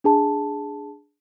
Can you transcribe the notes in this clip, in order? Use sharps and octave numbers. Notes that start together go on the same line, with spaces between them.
D4 G#4 A5